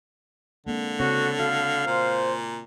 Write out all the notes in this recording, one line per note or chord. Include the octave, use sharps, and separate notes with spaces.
D3 G#3 A#3 C4
C#3 C4 F#4 A4 C#5
F#4 F5
A#2 C5